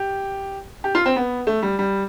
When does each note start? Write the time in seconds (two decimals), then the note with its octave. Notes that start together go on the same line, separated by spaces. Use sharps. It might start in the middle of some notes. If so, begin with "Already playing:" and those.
Already playing: G4
0.84 G4
0.95 F4
1.06 C4
1.16 B3
1.47 A3
1.63 G3
1.79 G3